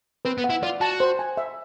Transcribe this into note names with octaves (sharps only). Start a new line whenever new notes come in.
C4 B4
B3
F#5
E4
F4 D5
F#4 A5
C5
G#5
E5